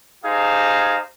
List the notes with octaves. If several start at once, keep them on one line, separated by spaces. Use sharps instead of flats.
D#4 G4 G#4 C5 F5